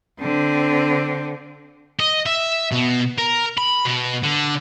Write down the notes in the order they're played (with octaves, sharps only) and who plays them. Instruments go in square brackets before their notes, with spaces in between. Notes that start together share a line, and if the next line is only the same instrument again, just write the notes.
[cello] D3 C4
[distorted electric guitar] D#5
E5
B2
A#4
B5
B2
D3